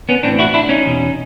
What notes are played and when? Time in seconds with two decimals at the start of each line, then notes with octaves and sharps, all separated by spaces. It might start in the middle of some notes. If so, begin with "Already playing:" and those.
0.09 B3 C#4
0.23 A2 C4 D4
0.28 E3
0.39 E4 F#4
0.54 D4 E4
0.69 C#4 D#4
0.86 E2 B2